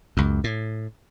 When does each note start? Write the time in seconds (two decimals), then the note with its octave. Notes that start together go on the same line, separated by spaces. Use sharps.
0.17 C#2 F#2
0.44 A2